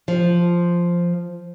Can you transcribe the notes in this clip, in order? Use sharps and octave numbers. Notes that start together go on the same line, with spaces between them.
F3